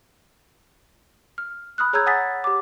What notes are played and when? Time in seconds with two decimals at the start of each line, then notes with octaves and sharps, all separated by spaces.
1.38 F6
1.78 B5 D#6 F6 F#6
1.93 G#4 C#5 A#5 E6 G6 G#6
2.06 F#5 G#5 D#6 A6 B6
2.44 G4 D6